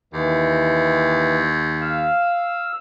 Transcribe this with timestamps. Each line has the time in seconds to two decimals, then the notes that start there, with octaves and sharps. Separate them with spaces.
0.14 D#2 E3
1.81 F5 E6